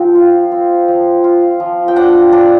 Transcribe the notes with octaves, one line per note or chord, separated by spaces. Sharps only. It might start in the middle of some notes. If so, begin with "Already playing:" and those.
Already playing: F3 C4 G5
F4
C4
F3
F4
F3
G5
D4 F#5
D4